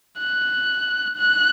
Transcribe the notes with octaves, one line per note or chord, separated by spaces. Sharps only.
F#6
F#6